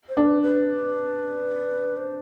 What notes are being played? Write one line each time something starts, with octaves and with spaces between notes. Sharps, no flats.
C5
D4 A4
B4
B4
C5